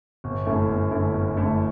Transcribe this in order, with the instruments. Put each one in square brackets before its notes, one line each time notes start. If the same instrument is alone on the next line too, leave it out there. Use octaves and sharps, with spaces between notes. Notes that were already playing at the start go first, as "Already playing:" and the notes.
[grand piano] G1
F#2 D3 A3 E4
G1
F#2 D3 A3 E4
G1
F#2 D3 A3 E4